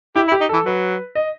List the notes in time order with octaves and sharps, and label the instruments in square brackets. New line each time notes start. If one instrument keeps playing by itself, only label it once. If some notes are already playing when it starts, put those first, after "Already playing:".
[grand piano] E4 [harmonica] G4
[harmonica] E4
[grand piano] G4
[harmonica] D#4
[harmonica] E3 [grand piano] A4
[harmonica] F#3 [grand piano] B4
[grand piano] D#5